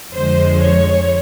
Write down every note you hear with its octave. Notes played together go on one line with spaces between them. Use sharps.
F2 D3 F3 G#3 C5
C#5